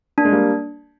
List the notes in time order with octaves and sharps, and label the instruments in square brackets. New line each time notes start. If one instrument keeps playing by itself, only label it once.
[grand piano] A#3 [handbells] D4
[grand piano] G#3
G3 A#3